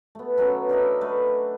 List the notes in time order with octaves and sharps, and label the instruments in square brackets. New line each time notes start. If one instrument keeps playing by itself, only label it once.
[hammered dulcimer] A3 B3
B2 F#3 B3 C#4
D4 A#4 D#5 E5
A3 B4